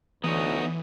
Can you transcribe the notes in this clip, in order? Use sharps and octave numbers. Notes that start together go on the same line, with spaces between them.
D2 E3 B3 D#4 C#5 A#5 D#6